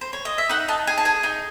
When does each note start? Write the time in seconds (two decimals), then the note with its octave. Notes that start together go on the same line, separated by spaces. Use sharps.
0.01 C5
0.13 C#5
0.25 D#5
0.38 E5
0.49 D#4 F#5
0.68 D#4 A5
0.87 G#4 G#5
0.98 A5
1.05 G#4 G#5
1.23 D#4 G#5